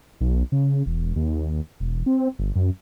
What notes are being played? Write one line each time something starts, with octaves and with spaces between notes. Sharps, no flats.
B1
C#3
E1
D#2
E1
C4
G1
F#2